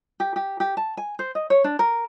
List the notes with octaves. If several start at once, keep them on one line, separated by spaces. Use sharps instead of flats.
G4
G4
G4
A5
G#5
C5
D#5
C#5
D4
A#4